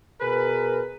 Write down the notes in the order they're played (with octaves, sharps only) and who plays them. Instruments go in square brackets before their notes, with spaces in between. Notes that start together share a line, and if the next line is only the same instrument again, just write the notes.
[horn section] B2 G#4 A#4 B4